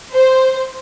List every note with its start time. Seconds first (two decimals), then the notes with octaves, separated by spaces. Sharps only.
0.13 C5